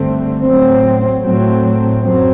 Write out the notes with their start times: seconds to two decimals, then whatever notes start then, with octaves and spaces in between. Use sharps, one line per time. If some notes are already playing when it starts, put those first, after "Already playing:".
Already playing: G2 D3 A3 C4
0.43 A2 F#3 C4
1.23 A2 F#3 A3 C4
2.02 F#2 F#3 C4